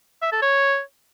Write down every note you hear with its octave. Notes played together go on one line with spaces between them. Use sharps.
E5
A4
C#5